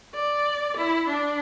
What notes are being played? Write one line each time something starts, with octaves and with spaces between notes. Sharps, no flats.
D5
E4
D4